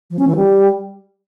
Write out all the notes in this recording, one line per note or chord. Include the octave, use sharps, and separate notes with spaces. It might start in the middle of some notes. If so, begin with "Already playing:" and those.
F3
C#4
E3
G3